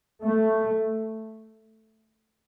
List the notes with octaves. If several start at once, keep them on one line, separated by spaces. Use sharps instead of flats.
A3